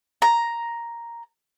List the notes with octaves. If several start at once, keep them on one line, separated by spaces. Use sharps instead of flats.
A#5